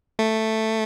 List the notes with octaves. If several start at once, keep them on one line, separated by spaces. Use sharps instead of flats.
A3